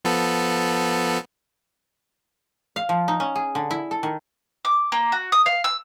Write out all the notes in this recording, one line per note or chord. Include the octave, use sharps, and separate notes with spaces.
F3 B3 A4
F5
F3
D#4
C#4
G#4
D3
E4
A4
D#3
D6
A#3
F#4
D#6
F5
E6